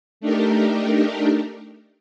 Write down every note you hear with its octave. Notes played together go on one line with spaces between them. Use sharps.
A3 D4 D#4 G4 A#4